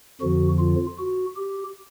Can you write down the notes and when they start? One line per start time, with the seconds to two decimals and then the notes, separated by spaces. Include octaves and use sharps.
0.21 F2 D3 F3 F#4
0.59 F4
0.98 F#4
1.37 G4